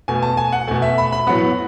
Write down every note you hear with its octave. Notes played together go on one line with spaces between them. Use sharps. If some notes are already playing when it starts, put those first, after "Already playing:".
B2 A3 G#5
A5
G#5
F#5
B2 A3 G#5
E5
B5
B5
A2 F#3 B3 F#5